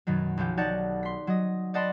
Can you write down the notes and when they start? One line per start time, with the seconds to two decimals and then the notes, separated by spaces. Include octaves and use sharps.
0.07 F#2 B2 D#3 F#3
0.37 B1 F3 F#3 G4
0.57 D#4 G4 C#5 D5 F#5 A5
1.03 C6 B6
1.27 F#3 D#5
1.74 D5 D#5 F#5 A5 B5 C6